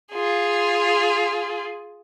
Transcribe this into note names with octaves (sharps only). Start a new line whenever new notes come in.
F4 G#4